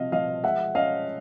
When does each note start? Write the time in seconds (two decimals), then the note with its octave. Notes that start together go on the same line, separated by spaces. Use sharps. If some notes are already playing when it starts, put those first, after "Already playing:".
Already playing: C3 F3 D#5 F5
0.12 F3 D#5 F5
0.44 G#3 E5 F#5
0.75 C#4 D#5 F5